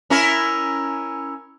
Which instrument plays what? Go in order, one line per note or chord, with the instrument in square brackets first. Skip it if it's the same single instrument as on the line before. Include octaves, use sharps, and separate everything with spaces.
[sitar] C#4 E4 A#4